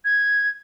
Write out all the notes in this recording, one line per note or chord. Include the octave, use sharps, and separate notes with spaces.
G#6